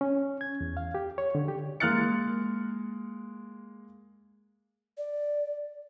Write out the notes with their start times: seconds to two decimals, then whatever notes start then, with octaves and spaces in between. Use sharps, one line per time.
0.01 C#4
0.41 G#6
0.61 E2
0.77 F5
0.95 G4
1.18 C#5
1.35 D3
1.48 G4
1.80 G#3 A#3 F6 F#6 A6 C#7
4.98 D5